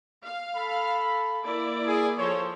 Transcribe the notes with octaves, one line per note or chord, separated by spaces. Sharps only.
F5
A4 B5
A#3 E4 D5
G#4
F3 A4 C5 C#5